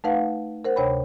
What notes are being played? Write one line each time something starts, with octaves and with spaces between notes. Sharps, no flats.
A3 D#4 B4 F5 F#5
A#4 C5 F#5
D2 C3 C5 C#5 G5 B5